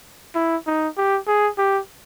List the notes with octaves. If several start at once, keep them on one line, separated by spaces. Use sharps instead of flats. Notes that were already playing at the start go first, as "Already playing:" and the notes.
E4
D#4
G4
G#4
G4